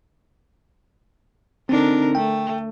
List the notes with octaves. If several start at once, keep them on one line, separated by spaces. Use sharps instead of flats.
D3 C4 D4 D#4 A#4
A3 G5